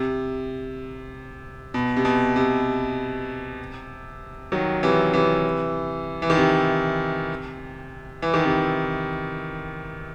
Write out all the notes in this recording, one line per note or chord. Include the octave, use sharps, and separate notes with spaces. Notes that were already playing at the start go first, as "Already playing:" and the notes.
Already playing: C3
B2
C3
B2
C3
D#3 F#3
C3 E3
C3 E3
E3
D#3
C3
E3
D#3
C3 E3